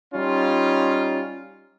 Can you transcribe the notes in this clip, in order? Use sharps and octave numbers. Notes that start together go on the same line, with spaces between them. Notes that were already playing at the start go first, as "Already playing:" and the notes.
G3 C#4 D#4 F4